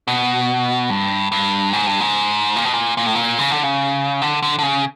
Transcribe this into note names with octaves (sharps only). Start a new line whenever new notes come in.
B2
G2
G2
G#2
G2
G#2
A#2
B2
A#2
A#2
A2
A#2
C#3
D3
C#3
D3
D3
D3
C#3